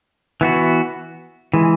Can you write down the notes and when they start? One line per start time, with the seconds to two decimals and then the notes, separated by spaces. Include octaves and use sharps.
0.41 E3 B3 F#4
1.53 E3 G#3